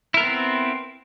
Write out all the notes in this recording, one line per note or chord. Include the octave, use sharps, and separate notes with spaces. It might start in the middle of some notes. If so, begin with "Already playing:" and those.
B3 C4 E4 A#4